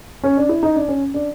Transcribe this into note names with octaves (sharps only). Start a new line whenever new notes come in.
C#4
D4
E4
D#4
D4
C#4
D4